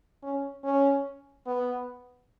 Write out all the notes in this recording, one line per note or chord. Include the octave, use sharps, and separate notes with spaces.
C#4
C#4
B3